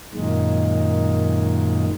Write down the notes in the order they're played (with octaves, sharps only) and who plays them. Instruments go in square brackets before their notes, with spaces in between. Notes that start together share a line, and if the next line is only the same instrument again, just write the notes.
[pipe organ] F#2 A#2 D#3 G#3